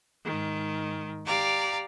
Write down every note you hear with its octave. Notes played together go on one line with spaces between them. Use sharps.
G#2 D#3
G4 D5 F5 A#5